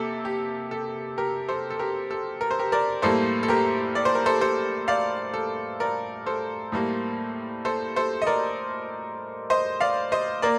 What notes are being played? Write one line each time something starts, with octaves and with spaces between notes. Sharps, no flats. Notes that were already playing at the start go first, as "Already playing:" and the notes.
Already playing: C3 A#3 A4
G4
A4
G4 A#4
A4 C5
A4
G4 A#4
A4
A#4
C5
G4 A#4
A#4 D5
A2 G3 A#3 A4 C5
A4
G4 A#4
D5
C5
A#4
A4 C5
A4 C5
D5 F5
A4
A#4 D5
A4 C5
A2 G3 A#3
A4 C5
A4 C5
D#5
A#4 D5
C5 D#5
D5 F5
C5 D#5
A#3 A#4 D5